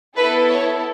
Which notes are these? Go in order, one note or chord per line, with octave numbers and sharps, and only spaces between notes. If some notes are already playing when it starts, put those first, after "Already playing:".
B3 E4 A4 B4
C#5